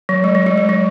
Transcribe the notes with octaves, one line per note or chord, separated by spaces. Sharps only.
F#3
G#3
F#3
G#3
G#3
F#3